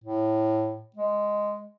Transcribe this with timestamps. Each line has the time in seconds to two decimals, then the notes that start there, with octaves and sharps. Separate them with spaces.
0.04 A2
0.96 G#3